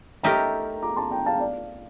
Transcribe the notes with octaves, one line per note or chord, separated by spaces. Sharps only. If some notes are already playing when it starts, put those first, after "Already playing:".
A3 D#4 G4 A#4 G5 A#5
A#5 D6
A5 C6
G5 A#5
F5 A5
D5 F5